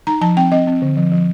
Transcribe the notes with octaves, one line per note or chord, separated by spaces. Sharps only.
D#4 A#5
F3 A5
C4 G5
C4 D#5
C4
D3
F3
F3